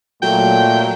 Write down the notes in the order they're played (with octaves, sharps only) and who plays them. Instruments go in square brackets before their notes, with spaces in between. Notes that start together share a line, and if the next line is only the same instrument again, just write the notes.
[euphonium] A#2 [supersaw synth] F#3 [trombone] A3 [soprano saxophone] G5